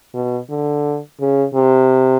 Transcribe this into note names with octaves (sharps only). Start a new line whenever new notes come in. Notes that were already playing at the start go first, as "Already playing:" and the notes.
B2
D3
C#3
C3